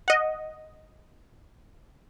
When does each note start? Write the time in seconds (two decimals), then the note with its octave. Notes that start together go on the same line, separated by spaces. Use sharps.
0.08 D#5 F#5